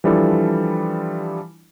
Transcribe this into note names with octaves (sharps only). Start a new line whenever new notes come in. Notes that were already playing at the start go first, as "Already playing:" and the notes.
E3 F3 G3 D4 E4 A4